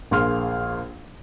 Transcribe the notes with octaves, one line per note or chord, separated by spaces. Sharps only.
A#1 A#3 G#4 C6 F6